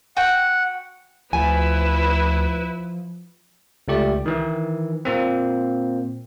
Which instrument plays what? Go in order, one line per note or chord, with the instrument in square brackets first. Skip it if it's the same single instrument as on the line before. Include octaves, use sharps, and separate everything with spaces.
[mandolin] F#4 G5 [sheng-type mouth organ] F#5
[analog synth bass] D2 [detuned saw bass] F3 [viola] E4 B4 [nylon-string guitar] G#5
[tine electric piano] C#2 A3 G4 D5
D#3 E3
A#2 A#3 C4